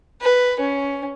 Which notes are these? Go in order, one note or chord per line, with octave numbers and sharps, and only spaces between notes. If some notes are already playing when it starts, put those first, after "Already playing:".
B4
C#4